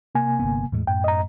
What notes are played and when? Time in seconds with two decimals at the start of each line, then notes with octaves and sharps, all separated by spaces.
0.15 C3 A#3 G#5
0.39 G1 B3
0.72 E2 A2 G#3
0.87 F#2 A2 G5
1.04 D#5 A#5